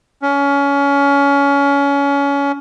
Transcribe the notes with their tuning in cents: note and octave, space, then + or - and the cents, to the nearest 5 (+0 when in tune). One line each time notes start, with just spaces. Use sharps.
C#4 +25